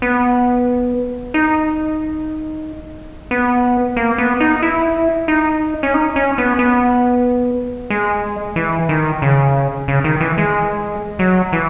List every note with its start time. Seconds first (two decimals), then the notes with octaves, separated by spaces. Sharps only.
0.02 B3
1.34 D#4
3.31 B3
3.96 A#3
4.18 B3
4.40 D#4
4.62 E4
5.28 D#4
5.83 C#4
5.94 D#4
6.16 C#4
6.38 B3
6.59 B3
7.90 G#3
8.56 E3
8.89 D#3
9.22 C#3
9.88 C#3
10.04 D#3
10.21 E3
10.38 G#3
11.19 F#3
11.52 E3